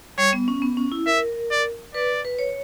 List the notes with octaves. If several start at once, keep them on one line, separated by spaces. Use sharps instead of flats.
G3 C#5
B3
C#4
B3
C#4
E4
A#4 E5
D5
B4 D5
B4
C#5